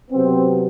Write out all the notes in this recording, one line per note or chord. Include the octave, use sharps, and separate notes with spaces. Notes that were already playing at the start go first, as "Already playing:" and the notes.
C3 F#3 B3 C4